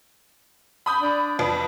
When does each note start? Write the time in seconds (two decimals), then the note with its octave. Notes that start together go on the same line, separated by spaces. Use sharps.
0.86 B5 D#6 G6
1.02 D4
1.39 F2 B4